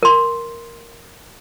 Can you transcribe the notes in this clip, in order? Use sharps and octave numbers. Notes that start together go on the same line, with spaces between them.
A#4 C6